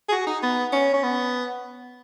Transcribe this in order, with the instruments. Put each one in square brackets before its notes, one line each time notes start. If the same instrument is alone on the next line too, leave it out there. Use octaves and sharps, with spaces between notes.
[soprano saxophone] G#4
F#4
D#4
B3
C#4
C#4
B3